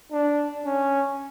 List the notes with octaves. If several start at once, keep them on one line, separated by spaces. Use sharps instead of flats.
D4
C#4